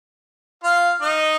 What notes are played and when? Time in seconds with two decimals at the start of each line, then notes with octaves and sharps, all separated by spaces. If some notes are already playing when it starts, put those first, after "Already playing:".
0.64 F4 F5
1.02 D#4 D#5